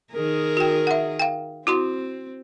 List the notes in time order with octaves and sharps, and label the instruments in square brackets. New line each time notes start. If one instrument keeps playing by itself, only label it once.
[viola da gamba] D#3 G#4 A#4
[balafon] F#4 G5
E5 F#5
F5 G5
[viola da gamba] C4 [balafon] E4 F#4 C6